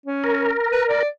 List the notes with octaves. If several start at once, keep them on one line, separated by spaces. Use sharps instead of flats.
C#4
A#4
B4
D5